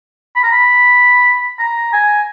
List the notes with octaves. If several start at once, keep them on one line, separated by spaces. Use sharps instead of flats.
B5
A#5
B5
A#5
G#5